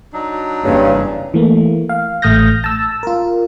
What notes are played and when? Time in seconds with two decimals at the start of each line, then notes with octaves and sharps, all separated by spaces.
0.13 F#3 D4 D#4
0.65 F#1 E2 G2 C#3
1.34 E3 A3 A#3
1.89 F5
2.22 A1 A3 D#6 F6 G6 A#6
2.64 A5 E6
3.03 F4 A#4